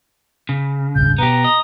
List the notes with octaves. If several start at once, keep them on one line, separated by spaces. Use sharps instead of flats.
C#3
D#1 G#1 C#2 G6
B2 B3 G4 A#5
D#5